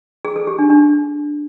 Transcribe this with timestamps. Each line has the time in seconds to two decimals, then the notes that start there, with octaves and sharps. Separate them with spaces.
0.25 G#4
0.36 A4
0.47 G4
0.59 D4
0.70 D4